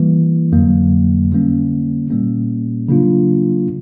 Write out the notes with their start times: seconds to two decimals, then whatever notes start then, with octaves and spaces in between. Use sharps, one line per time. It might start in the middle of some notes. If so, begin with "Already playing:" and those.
Already playing: E3 G3 A#3
0.52 F2 D3 F#3 A#3
1.31 D3 G3 A#3 C#4
2.10 A#2 G3 A#3 C#4
2.89 C#3 F#3 A#3 D4 F4